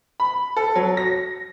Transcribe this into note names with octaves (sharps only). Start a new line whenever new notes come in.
B5
A4
F#3
A#6